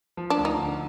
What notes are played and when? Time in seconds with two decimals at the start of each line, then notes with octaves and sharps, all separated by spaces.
0.17 F3
0.30 D4
0.37 D2
0.45 D#4
0.58 D3